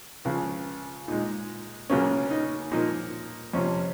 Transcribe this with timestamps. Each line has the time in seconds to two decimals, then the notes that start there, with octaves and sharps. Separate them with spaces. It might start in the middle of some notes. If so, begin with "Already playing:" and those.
0.25 C#2 C#3 F3
1.08 A#2 G#3 D#4
1.90 C#2 C#3 F#3 A#3 C#4
2.30 D#4
2.72 A#2 F3 A#3 D#4
3.53 F2 C3 F3 C#4